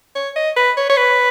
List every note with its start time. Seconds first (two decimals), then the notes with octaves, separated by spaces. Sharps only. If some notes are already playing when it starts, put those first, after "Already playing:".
0.16 C#5
0.36 D#5
0.56 B4
0.77 C#5
0.90 C#5
0.97 B4